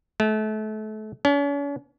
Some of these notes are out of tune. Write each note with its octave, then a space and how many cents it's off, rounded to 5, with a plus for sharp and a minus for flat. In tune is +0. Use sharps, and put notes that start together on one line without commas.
A3 -30
C#4 +40